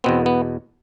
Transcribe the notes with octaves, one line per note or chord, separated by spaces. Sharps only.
E2 B2 B3 C4
B3